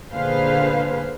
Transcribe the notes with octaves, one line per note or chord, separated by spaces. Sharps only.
A#2 D3 G#4 B4 C5 F5